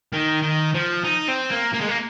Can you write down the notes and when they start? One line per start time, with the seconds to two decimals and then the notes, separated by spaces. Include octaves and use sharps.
0.13 D#3
0.42 D#3
0.74 F3
1.04 D#4
1.28 C4
1.51 A#3
1.74 A#3
1.81 G#3
1.89 A#3